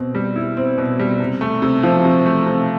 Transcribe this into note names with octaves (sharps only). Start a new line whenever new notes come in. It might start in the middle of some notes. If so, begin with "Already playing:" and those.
Already playing: B2 C4
G3
E4
C4
B2
G3
C3
A3
C3
F3
C3
A3
C3